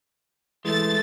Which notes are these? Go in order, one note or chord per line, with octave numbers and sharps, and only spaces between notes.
E3 G#3 A3 A6